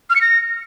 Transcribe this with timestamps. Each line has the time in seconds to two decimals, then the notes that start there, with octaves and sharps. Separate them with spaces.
0.10 F6
0.15 C#7
0.21 A#6